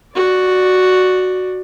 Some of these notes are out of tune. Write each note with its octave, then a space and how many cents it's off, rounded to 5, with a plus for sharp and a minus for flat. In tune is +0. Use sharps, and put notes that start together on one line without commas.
F#4 +0 D5 +10